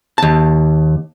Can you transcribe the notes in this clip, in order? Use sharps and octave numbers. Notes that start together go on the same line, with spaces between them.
D#2 A5